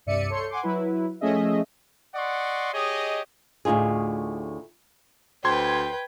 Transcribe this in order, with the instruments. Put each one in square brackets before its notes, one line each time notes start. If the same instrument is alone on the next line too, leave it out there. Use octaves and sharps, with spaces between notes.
[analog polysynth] C2 G2 D5 E5 C#7 D#7
A4 C#5 C6 G6 C#7
F#5 G#5 C6 D6
F#3 E4 B4
F3 A3 C#4 G#4 D#5 E5
[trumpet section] D5 D#5 F#5 C6 C#6
G4 G#4 C#5 D#5
[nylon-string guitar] D2 A2 D#4 F4 G#4
[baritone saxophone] D2 [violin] B4 G5 [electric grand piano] C5 C6 G#6